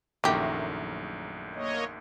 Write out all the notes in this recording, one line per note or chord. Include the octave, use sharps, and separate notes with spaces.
A#1 F#2 D#3 E3 F#3 A3 G4 A#4
A#3 C#5 D#5